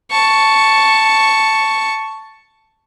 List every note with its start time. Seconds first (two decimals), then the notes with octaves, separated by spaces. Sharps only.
0.11 A5 C#6